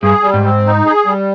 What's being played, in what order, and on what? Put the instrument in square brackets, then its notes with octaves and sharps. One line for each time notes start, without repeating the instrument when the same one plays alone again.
[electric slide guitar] G2 [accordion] G#4
[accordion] G3
[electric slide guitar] G#2
[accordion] C4
D#4
G#4
G3